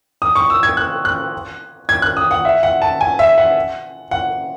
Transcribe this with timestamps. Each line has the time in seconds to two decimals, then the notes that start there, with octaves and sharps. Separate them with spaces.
0.22 D#6
0.36 C#6
0.50 E6
0.63 G#6
0.77 F#6
1.05 F#6
1.89 G#6
2.02 F#6
2.17 D#6
2.31 F#5
2.45 E5
2.63 F#5
2.82 A5
3.01 G#5
3.19 E5
3.38 F#5
4.11 F#5